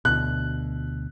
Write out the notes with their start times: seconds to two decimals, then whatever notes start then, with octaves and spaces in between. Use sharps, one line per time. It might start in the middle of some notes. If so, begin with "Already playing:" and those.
0.05 D2 B2 F#6